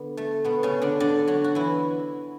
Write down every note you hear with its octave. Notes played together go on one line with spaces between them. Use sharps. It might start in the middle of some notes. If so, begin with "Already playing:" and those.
Already playing: D3 B3
A3
B2 B3
C#3 C#4
D3 D4
D3 D4
F#3 F#4
F#4
E3 E4